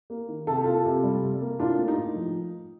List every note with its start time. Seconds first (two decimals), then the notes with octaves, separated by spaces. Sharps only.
0.10 A#3
0.29 D#3
0.47 C3 A4
0.56 G4
0.64 A#3 F4 A4
0.85 C3
1.03 G3
1.22 C3
1.41 A#3
1.59 A2 D4 F4
1.78 A#3
1.88 D#4
1.97 A2
2.16 F3